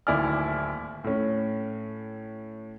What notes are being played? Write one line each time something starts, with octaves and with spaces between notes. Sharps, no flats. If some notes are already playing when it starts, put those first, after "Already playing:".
D1 D#2 E4 D5 G#5 F6
A2 C#4